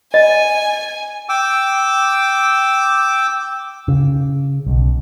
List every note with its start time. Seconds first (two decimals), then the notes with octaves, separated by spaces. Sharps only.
0.14 D#5 G#5
1.29 G5 D6 E6
3.88 C#3
4.67 B1